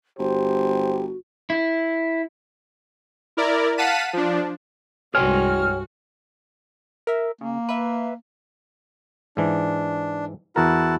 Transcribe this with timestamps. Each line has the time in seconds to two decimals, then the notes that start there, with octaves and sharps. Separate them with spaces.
0.19 G1 F#4 G4 C5
1.50 E4
3.37 E4 A#4 D5
3.77 F5 F#5 A5 B6 D#7
4.13 F3 D4
5.15 C2 G2 G#3 F#4 C#5 G5 G#5 F6
7.07 A#4 E5
7.41 C#3 A#3
7.69 B4 E5
9.37 G#2 E3 D4
10.56 E2 E4 F#4 A#4 A5